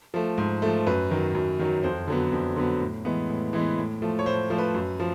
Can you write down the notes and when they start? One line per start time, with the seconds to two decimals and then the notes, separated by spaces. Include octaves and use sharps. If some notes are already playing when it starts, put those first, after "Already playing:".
0.14 F3 A3
0.38 G#2
0.62 F3 A3
0.87 F#2 B4
1.11 D#3 F#3
1.35 F#2
1.59 D#3 F#3
1.83 F2 C5
2.07 D3 F#3 B3
2.32 F2
2.56 D3 F#3 B3
2.81 A2
3.05 E3 G#3 B3
3.30 A2
3.53 E3 G#3 B3
3.78 A2
4.02 F3 A3
4.19 C#5
4.26 A2 C5
4.50 F3 A3
4.58 B4
4.74 F#2
5.00 F3